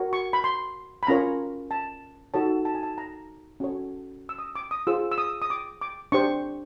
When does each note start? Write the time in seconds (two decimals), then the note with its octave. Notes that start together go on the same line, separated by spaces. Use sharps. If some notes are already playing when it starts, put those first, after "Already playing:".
Already playing: F#4 A#4 C#5
0.13 C#6
0.33 B5
0.44 C6
1.03 B5
1.07 C#4 F4 A#4 C#5 A#5
1.71 A5
2.34 D#4 F#4 A4 C#5 A5
2.65 A5
2.75 G#5
2.83 A5
2.98 A#5
3.60 C#4 F#4 A4 C#5
4.29 E6
4.39 D#6
4.55 D6
4.71 D#6
4.87 F4 G#4 C5 E6
5.12 E6
5.18 D#6
5.42 D#6
5.50 D6
5.81 D6
6.12 D4 G4 C5 C#6